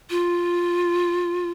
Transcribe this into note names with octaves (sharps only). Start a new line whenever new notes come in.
F4